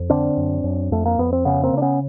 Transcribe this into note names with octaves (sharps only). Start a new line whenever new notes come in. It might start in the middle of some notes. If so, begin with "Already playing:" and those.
Already playing: F2
D3 C4 D4
F#2
F#2
F2 A3
A#3
F2 B3
C4
C#3 B3 C#4
A#3 C4
C#3 D4
B3 C#4